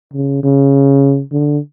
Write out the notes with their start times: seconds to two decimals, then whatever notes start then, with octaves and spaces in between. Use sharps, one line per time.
0.14 C#3
0.43 C#3
1.32 D3